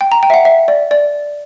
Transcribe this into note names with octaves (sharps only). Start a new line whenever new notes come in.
G5
A#5
G5
E5
F#5
E5
D5
D5